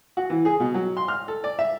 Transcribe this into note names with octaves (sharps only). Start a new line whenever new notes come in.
F#4
E3
G#4
B2
F#3
C6
F6
A4
D5
E5